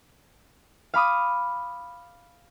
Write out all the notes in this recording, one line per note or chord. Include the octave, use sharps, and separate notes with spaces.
F5 B5 D6 D#6